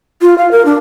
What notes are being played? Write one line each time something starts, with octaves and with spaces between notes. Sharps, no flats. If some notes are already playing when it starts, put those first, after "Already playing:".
F4
F5
A#4
D4